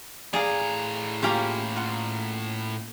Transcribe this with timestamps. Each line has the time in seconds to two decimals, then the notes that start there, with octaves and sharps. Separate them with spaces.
0.33 A2 G#4 D5 F5 A#5
1.23 A#3 C#4 F4 G4
1.76 F4 F#5